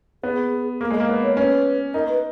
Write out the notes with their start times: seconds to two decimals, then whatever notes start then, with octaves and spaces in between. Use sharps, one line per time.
0.23 B3 G#4
0.81 A#3 G#4
0.90 G#3
0.95 A#4
1.00 A#3
1.09 B3
1.23 C#5
1.37 C#4 B4
1.94 D#4 A#4
2.08 B4